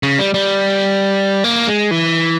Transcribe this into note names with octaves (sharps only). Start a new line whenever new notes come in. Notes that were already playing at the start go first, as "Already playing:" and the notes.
C#3
G3
G3
A#3
G#3
E3